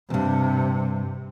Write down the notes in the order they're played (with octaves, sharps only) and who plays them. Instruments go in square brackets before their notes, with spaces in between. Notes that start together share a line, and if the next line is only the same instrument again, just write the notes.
[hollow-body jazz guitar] E2 G2 [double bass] C3